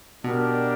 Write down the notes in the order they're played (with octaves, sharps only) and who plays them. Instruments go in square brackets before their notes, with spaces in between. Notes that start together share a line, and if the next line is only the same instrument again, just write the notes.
[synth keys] B2 [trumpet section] D4 G4 A#4